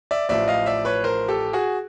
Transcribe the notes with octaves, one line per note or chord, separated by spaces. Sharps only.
D5 E5
A1 A2 F3 D5 E5
D#5 F5
D5 E5
B4 C#5
A#4 C5
G4 A4
F#4 G#4